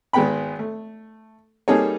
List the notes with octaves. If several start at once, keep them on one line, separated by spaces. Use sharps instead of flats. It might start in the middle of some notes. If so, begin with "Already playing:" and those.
G#1 G#3 B3 G5 B5
A3
G3 A#3 D#4 G#4 A4 C#5